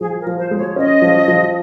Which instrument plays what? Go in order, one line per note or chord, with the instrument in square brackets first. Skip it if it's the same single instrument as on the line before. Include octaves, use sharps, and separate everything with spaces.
[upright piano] F3 [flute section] G#4
[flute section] A#4
[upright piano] F3
[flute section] C5
[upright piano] G#3
[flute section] C#5
[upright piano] C#4 [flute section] D#5
[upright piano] F3
F3